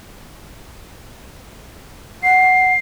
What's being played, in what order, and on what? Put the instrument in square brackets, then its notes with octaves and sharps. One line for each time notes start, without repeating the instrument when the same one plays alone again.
[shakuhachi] F#5 [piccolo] C7